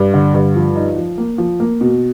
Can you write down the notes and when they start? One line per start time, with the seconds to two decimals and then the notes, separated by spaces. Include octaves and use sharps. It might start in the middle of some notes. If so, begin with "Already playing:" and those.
Already playing: G2
0.14 D3
0.34 G2
0.55 F3
0.76 D#4
0.96 F3
1.18 A#3
1.38 F3
1.60 A#3
1.81 B2